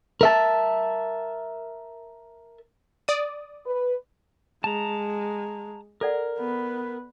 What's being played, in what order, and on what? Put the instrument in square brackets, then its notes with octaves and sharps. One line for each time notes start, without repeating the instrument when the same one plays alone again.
[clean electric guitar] A#4 E5 A5
[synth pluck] D5 D#6
[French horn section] B4
[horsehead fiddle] G#3 [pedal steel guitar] A5 A#5
[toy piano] A4 D5 F#5 [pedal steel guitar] A#4
[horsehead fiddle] B3 B4